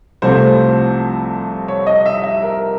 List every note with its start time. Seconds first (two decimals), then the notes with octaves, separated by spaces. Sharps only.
0.22 C2 C3 F3 A3 C5
1.68 C#5
1.87 D#5
2.06 E5
2.24 E5
2.42 A#4